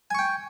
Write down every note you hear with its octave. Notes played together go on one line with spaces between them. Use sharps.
G5 G#5 C#6